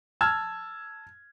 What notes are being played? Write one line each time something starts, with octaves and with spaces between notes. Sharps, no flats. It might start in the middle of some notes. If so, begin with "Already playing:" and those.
A5 E6 F6 G#6